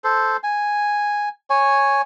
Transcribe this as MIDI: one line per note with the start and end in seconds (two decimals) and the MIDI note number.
0.04 0.37 69
0.04 0.37 72
0.43 1.29 80
1.50 2.02 73
1.50 2.02 80